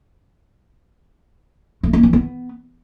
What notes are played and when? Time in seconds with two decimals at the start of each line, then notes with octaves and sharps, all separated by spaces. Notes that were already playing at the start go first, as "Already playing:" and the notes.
1.83 A3
1.93 A#3
2.03 E3
2.13 B3